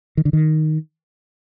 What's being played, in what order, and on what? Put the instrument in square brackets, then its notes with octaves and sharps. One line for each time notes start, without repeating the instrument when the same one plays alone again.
[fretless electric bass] D#3
D3
D#3